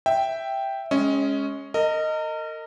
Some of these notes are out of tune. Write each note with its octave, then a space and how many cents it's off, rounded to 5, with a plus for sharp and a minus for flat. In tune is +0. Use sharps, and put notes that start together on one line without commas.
E5 +0 G5 +0
G#3 +0 C#4 +0 D#5 +25
A#4 -35 D#5 +0